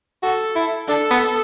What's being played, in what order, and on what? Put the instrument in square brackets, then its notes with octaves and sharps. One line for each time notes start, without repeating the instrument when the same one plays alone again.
[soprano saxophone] F#4 [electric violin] A4
[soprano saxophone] E4
[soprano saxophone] D4 [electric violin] A4
[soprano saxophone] B3